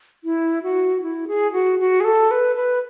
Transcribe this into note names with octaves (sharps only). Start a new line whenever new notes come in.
E4
F#4
E4
G#4
F#4
F#4
G#4
A4
B4
B4